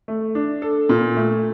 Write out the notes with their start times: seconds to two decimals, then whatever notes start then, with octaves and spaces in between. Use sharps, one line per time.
0.08 A3
0.35 D4
0.62 A4
0.89 A#2
1.17 A3